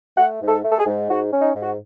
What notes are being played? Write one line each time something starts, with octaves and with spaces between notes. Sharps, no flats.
A3 F#5
G#2
A4
A3
A4
G#4
G#2
G#2 F#4
C#4
D#4
G#2
F#4